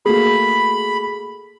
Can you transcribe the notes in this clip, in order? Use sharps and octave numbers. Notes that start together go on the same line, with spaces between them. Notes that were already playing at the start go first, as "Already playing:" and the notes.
A3 A#3 F#4 G#4 B5